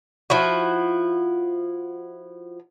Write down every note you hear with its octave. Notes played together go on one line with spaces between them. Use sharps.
F3 E4 F#4